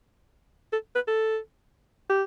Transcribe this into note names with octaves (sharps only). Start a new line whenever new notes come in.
A4
B4
A4
G4